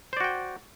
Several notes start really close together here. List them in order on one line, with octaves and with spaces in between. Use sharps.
C5 D5 F#4 G5